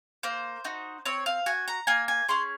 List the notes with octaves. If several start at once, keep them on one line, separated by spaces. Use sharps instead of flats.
A#3 C5
D#4 F#4
C4 C#5
F5
F#4 G#5
A#5
A#3 G#5
G#5
C#4 G#4 C6